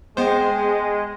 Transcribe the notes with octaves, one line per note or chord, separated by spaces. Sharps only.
G#3 B3 C5 D#5 G5 C6